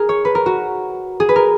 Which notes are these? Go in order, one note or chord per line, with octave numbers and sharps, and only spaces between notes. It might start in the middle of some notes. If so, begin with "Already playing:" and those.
Already playing: G#4 A#4
C#5
B4
A#4
F#4
G#4
B4
A#4